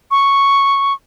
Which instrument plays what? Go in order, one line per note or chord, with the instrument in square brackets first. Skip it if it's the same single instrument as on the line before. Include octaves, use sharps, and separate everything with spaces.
[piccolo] C#6